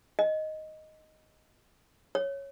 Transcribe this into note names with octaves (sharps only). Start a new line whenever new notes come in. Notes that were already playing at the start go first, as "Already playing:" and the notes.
D#5
C#5